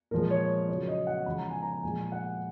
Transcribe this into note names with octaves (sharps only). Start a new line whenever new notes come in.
A#2 F3 G#3 A#4
C#5
C#3 F#3 C#5
D#5
F#5
C#3 F3 G#3 B5
A#5
G#5
A#5
A#2 F3 G#3 G#5
F#5